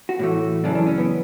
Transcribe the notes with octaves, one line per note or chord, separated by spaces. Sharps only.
F#4
A2 E3 A3
F#2 C#3 E3 D4
D4
C#4
B3